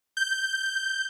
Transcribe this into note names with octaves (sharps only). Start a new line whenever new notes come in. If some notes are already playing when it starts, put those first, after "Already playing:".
G6